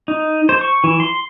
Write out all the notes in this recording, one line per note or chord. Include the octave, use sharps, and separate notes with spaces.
D#4
C5
C#6
E3
C6